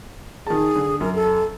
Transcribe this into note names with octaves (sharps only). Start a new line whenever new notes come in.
D#3 G#4 A5
D3
F#2 A#4
A4